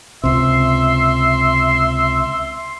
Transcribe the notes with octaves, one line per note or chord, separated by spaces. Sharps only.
C#2 C3 E5 C6